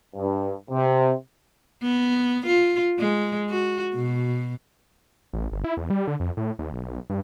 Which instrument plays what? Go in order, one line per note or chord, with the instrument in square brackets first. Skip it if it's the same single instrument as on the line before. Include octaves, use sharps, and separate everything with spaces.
[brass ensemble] G2
C3
[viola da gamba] B3
F4
G#3
F#4
B2
[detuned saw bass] A1
G1
E4
E2
G3
D3
F2
A2
D#2
B1
G2